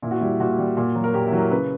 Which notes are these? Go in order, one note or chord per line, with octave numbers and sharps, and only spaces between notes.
A#2 E4
F#4
G3 E4
A#2 F#4
G3
A#2
F#3
A#4
A#2 G4
E4
F#3
A#4
C#3 B4